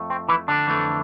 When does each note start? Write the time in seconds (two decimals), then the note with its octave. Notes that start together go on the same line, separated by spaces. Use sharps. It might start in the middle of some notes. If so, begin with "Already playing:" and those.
Already playing: F2 A3
0.10 C4
0.29 E3 E4
0.48 D3 D4
0.67 F2 E3 A3